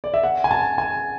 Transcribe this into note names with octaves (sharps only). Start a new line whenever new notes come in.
D5
E5
F#5
G#5
A5
G#5